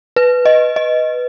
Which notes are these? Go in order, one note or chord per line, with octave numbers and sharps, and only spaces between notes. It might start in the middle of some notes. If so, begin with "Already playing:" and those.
B4
D#5
D#5